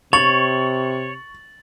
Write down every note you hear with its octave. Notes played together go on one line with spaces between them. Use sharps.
C3 C#5 C#6 A6 F#7